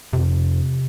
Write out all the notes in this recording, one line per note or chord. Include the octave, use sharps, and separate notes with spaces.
F2 C3